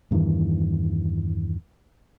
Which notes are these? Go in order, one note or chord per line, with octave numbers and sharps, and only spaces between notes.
E2 G2 D#3 E3